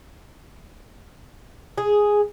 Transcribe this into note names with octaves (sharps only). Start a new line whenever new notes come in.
G#4